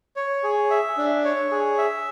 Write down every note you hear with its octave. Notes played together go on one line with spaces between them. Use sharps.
C#5
G#4
E5
D4
C#5
G#4
E5